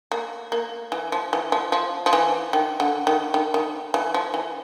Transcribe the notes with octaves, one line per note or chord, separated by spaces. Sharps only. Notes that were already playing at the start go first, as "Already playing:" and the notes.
A#3
A#3
E3
F3
E3
F3
F3
F3
E3
D#3
D3
D#3
D#3
D#3
E3
F3
E3